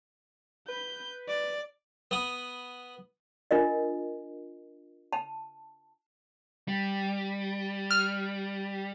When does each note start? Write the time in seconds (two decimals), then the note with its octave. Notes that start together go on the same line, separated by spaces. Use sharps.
0.68 B4 G6
1.28 D5
2.11 B3 D#6
3.51 D4 F4 A#4 D#5
5.13 A5
6.68 G3
7.91 F6